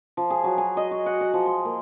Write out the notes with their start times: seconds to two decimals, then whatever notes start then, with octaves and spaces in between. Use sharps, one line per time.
0.17 F3
0.30 G#4
0.44 F#3
0.58 G#5
0.77 D#5
0.91 F#4
1.06 F#5
1.21 F#5
1.34 F3
1.46 C6
1.65 A#3